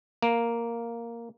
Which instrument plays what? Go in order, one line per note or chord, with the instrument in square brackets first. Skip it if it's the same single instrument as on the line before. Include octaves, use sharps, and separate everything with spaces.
[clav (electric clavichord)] A#3